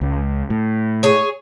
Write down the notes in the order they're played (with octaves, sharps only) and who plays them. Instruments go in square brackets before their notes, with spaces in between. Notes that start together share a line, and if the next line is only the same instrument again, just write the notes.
[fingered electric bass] C#2
A2
[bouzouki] G#4 C#5